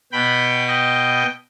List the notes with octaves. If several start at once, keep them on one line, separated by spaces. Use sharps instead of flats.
B2 B3 G5 B5
D#5 G5